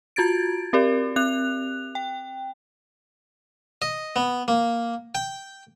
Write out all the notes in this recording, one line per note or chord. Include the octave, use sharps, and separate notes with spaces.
F4 F#4 G#6 A6 D7
C4 G4 A#4 D5
C4 F#6 F7
G5
D#5
B3
A#3
G5